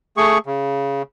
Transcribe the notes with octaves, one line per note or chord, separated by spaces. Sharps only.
A3 G#4 C#6
C#3